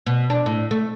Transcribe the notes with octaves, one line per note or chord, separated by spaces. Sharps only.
B2
D4
A2
A3